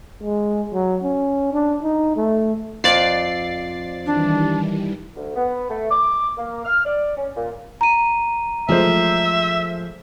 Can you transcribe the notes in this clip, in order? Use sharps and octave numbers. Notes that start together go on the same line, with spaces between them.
G#3
F#3
C#4
D4
D#4
A3
F2 D5 A6 C7
D#3 E3 G3 D4
D2
B3
A3
D6
A#3
F6
D5
C#4
A#2
A#5 D#7
F3 G#3 A3 C5 E5